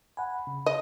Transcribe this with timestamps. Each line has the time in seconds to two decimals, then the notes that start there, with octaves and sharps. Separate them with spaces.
0.17 F#5 G#5 B5
0.47 C#3
0.66 D#5